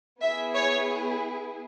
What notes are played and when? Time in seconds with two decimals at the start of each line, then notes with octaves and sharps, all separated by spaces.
0.22 B3 E4 G#4 E5
0.55 C#5